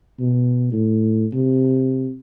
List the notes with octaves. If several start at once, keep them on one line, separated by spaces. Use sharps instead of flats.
B2
A2
C3